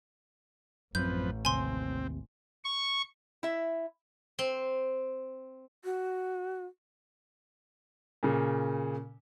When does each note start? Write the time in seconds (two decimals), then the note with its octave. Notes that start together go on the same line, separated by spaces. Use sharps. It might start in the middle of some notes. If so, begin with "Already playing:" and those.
0.95 A1 F#2 F3 C4 B4 G6
1.45 D#2 C3 C4 G#5 C6
2.64 C#6
3.43 E4 E5
4.39 C4
5.85 F#4
8.23 A#2 C#3